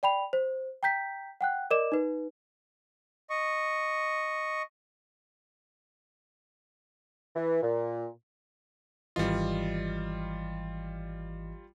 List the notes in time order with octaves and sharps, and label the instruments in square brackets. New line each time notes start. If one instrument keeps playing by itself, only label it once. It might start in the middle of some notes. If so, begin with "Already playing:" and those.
[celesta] D5 G5 B5 F7
C5
G5 A#5 G6 B6
F#5 G5 F#6
A#4 D5 D#5 D6 E7
D#4 B4
[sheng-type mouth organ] D#5 C#6
[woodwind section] E3
A#2
[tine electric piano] G#1 E3 D#5 [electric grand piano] G3 F4